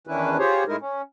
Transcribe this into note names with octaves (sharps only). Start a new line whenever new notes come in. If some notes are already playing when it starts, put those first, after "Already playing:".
E2 D#3 C#4 D4 E4 B4
F4 G4 G#4 C5 C#5
A2 G#3 D#4 E4 A#4
C#4